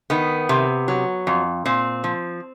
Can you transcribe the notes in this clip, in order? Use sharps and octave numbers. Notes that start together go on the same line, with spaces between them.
D#3 B3
C3
F#3
F2
A#2 C4
F3